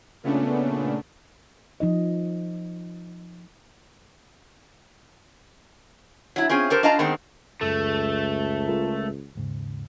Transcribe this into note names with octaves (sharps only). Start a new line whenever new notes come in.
A#2 C#3 A3 B3 C#4 D4
F3 D#4 D#5
F#3 E4
C4 C#4 F4 G#4
G4 A4 A#4 C5
D4 F4 D#5 F5 A5 A#5
D#3 G#3 B3 C4
C#2 F#2 A3 A4
G#3 F4 A#4
D#2 G#2 C#3